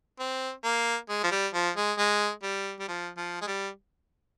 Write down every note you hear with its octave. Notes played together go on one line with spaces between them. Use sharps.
C4
A#3
G#3
F3
G3
F3
G#3
G#3
G3
G3
F3
F3
G#3
G3